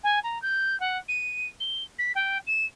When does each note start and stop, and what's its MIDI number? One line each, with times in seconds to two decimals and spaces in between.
0.03 0.19 80
0.23 0.40 82
0.42 0.78 91
0.80 0.97 78
1.08 1.48 99
1.60 1.83 103
1.98 2.12 95
2.15 2.38 79
2.47 2.65 100